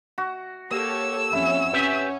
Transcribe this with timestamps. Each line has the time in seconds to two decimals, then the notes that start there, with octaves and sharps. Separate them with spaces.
0.18 F#4
0.71 A#3 G4 A4 C#5 E6
1.33 F2 C#4 E4
1.73 C#4 G4 B4 E5